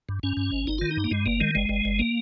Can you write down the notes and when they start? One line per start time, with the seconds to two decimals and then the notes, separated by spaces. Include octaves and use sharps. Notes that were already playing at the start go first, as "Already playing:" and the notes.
0.09 G2
0.23 G2 C#4
0.37 G2
0.52 G#1
0.67 G1 D#4
0.78 D#3 F4
0.91 D#4
0.97 G2
1.04 A#3
1.11 G2 G#3
1.26 G1 A#3
1.40 D#3 G#3
1.55 G1 G#3
1.69 G1
1.85 G1
1.99 A#3